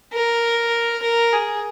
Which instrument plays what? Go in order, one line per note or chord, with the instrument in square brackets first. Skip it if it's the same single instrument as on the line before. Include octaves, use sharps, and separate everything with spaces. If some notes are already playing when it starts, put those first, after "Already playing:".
[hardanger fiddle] A#4
A#4
G#4